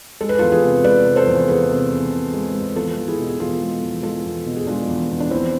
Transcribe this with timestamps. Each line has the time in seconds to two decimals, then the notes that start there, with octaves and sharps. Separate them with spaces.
0.21 G#3 A4
0.29 B4
0.39 E2 F4 A4
0.52 G#4 B4
0.64 C3
0.84 G#3 B4 D5
1.05 C3
1.16 A4 C5
1.27 E2
1.48 E2 G#4 B4
1.69 C3
1.90 E2
2.12 C3
2.34 G#3
2.55 G#3
2.75 E2 F4 A4
2.97 E2
3.08 E4 G#4
3.19 B2
3.29 G#4
3.40 E2 F4 A4
3.61 G#3
3.83 E2
4.03 G#3 F4 A4
4.25 E2
4.46 B2
4.56 G#4
4.67 G#3 D4 F4
4.88 E2
5.10 E2
5.20 D4
5.31 E2 C4 E4